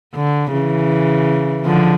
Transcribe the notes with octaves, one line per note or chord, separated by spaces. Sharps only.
D3
C#3 E3
D3 F3